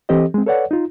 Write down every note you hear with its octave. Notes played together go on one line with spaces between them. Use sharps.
E3 C4 G4 A4 C5 D#5
G#3 C4
A4 B4 C#5 D5 F#5
D#4 F4